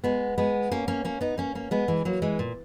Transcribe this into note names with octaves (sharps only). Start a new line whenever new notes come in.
G#3 B3
G#3 B3
A#3 C#4
A#3 C#4
A#3 C#4
B3 D#4
A#3 C#4
A#3 C#4
G#3 B3
E3 G#3
F#3 A#3
E3 G#3
A#2